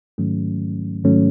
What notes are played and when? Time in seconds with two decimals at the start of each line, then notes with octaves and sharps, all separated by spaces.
0.18 G#2 D#3 F#3 A3 C#4
1.04 G#2 D#3 F#3 A3 C#4